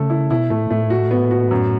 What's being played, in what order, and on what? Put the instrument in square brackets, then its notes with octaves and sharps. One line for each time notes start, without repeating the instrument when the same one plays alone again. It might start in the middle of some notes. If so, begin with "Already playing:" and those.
Already playing: [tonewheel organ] C#3 [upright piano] A3 A4
[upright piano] E4
[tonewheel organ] B2 [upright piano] E4
[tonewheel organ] A2 [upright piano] A3
[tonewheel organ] A2 [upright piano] A3
[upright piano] F#4
B3
F#4
F#2